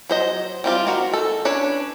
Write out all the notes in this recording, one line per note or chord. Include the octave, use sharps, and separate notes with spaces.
F#3 C5 D#5
G3 C4 F4 D5
D#3 F#4 A#4
A4
C#4 D4 B4 C#5